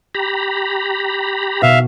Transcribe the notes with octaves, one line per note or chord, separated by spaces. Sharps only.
G4 A#5 B5
B2 E5 F5